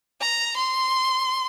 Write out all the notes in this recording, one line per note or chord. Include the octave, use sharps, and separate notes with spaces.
A#5
C6